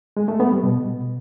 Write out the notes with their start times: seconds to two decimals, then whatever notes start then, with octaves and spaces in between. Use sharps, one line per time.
0.17 G#3
0.28 A3
0.40 B3
0.51 G3
0.63 B2